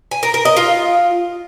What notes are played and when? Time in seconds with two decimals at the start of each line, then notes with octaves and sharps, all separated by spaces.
0.11 G#5
0.23 A#4
0.34 A#4
0.45 D#5
0.57 F4